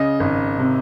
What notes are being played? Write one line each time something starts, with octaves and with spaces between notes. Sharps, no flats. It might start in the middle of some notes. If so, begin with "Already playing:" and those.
Already playing: C#3 D#5
G#1
C3